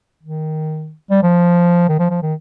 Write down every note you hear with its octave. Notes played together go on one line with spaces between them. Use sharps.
D#3
G3
F3
D#3
F3
F3
D#3